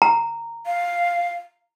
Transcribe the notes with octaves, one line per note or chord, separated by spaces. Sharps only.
A#5
F5